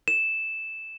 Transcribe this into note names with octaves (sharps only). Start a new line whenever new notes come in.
E7